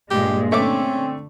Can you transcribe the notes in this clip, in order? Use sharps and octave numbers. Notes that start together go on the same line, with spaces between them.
G2 A#2 G#3 G4
D3 A3 C4 C#4 E5 D6